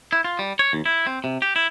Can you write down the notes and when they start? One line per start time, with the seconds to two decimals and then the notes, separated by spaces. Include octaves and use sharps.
0.13 E4
0.24 F4
0.39 G3
0.59 C#5
0.73 D#2
0.86 E4
1.07 C4
1.24 C3
1.42 G4
1.56 E4